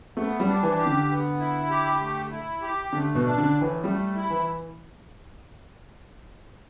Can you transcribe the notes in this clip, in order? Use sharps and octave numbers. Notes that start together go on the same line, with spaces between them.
A3 B3
G3
D4
E3
G4
D3
B3
E4
G4
A3
E4
G4
D3 A3
B2
D4
D3
A2
E3
G3 A3
E4
E3